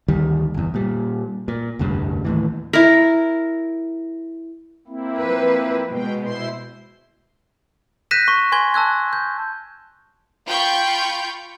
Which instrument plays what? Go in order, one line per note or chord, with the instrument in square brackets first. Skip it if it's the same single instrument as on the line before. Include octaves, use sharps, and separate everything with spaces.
[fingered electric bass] D2 D#3 G3
F#1 E2
A#2 G3
A#2
F1 D2 G2 C#3
D#2 A2 E3
[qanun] E4 A#4
[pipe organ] A#3 C4 E4
[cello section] F3 B4
[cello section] B2 G#3 [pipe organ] G5
[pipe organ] E4 C5 C6
[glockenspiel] F#6 G6 A#6 B6 D#7 E7
C#6
G#5 C6 G#6 G7
A5 E6 F#6 G#6
G6
[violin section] F4 G5 B5 C#6 G6